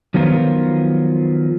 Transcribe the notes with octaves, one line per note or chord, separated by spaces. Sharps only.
D#3 F3 F#3 B3 F4 A#4